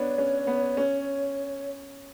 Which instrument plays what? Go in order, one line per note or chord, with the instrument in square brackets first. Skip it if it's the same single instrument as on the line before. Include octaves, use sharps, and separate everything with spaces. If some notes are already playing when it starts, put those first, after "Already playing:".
Already playing: [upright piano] B3 D4 [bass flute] C#5
[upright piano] C#4
B3
C#4